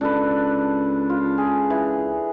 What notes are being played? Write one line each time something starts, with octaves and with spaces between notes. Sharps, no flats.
C#2 D4 A4 B4
F4
G#4
E3